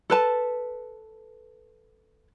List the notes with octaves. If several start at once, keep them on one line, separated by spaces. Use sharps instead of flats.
A4 B4 A5